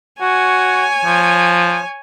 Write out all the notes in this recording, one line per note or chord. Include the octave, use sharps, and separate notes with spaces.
F#4 C#5 G#5
F3